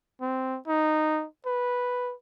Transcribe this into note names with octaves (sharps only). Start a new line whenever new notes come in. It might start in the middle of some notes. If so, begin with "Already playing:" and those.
C4
D#4
B4